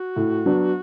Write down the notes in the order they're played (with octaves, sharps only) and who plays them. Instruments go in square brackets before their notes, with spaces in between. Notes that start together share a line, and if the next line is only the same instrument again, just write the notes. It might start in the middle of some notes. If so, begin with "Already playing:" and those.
Already playing: [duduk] F#4
[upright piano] A2
F#3 B3 D4